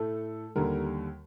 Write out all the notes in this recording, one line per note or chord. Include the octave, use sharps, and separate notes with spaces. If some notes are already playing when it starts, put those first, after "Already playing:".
Already playing: A2 A3 A4
D#2 D3 G3 A#4